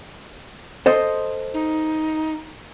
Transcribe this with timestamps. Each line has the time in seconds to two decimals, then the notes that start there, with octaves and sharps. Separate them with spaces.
0.86 A4 C5 D#5
1.54 D#4